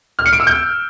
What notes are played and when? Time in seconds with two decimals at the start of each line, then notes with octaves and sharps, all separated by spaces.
0.19 F6
0.26 C#7
0.33 D7
0.40 E6
0.47 G6